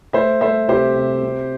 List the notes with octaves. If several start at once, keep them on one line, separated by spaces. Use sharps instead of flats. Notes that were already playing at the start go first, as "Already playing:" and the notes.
A3 C5 E5
A3 C5 E5
C3 G4 C5
C3
C3